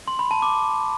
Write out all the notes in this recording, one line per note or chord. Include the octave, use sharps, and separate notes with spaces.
C6
B5
A5
D6